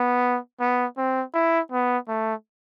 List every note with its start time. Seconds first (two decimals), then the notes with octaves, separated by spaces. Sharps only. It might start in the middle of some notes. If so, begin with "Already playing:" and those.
Already playing: B3
0.60 B3
0.98 C4
1.34 E4
1.72 B3
2.08 A3